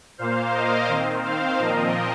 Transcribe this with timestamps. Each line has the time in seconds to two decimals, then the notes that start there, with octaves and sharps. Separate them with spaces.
0.18 A#2 A#3 C5 F5
0.53 A#4 D#5
0.88 D#3 C4
1.23 C5 F5
1.58 A#2 F3 C4 A#4 D#5